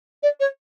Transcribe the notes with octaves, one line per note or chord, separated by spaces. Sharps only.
D5
C#5